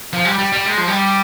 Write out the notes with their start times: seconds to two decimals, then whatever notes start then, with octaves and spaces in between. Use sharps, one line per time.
0.13 F3
0.25 G3
0.38 G3
0.52 G3
0.66 G#3
0.77 F3
0.88 G3